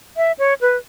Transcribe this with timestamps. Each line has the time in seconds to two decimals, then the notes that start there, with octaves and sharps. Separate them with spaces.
0.17 E5
0.39 C#5
0.61 B4